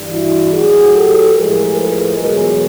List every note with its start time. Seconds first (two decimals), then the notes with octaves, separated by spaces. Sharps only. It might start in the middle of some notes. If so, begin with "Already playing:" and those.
Already playing: G2 E3 G3
0.10 E4 F#4
0.52 A2 F#3 F#4 G#4
0.93 G4 A4
1.35 A2 F3 G#3 G#4 A#4
1.76 A4 B4
2.18 E2 B2 F#3 G#4 A#4